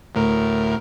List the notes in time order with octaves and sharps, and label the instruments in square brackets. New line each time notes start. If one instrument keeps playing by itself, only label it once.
[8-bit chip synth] D2 A2 A#4